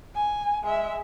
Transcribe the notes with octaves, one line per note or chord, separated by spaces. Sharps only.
G#5
G#3 E5